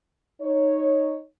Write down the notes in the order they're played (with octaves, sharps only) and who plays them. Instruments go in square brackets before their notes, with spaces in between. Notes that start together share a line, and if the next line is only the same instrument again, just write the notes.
[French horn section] D#4 C#5